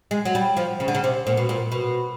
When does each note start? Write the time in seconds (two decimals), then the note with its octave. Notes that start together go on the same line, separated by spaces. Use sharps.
0.11 G#3
0.25 F#3
0.35 G3
0.57 F3
0.80 C#3
0.88 D3
0.95 C#3
1.04 C3
1.27 A#2
1.37 B2
1.49 A#2
1.72 B2